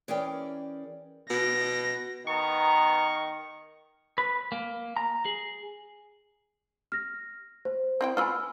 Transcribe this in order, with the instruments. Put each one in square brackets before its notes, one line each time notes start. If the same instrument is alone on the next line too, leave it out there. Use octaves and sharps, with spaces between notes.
[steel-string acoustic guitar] E3 C#4 G#4 A#4 D5 G5
[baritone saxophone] B2 [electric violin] A#6
[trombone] D#3 [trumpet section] B3 A#5 [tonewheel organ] C#6
[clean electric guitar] B4
A#3
A#5
G#4
[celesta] F6 A#6
C5
[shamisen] C4 E4 G5
[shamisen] B3 F4 B5 [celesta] G#5 E6 F6